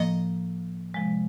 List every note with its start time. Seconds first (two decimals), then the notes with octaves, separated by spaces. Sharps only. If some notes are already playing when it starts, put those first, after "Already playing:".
Already playing: A2 F3 A#3 D#5
0.94 C3 F3 G#3